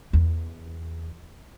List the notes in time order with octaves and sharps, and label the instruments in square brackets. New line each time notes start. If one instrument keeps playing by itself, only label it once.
[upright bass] E2